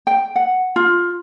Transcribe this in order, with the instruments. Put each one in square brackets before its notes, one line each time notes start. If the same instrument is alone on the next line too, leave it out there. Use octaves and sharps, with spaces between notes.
[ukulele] G5
F#5
F4